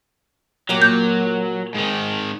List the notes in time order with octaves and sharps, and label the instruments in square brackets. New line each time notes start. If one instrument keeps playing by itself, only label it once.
[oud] A#2 A#3 G4 [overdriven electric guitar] F#3
[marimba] G6
[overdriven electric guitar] G#2 D#3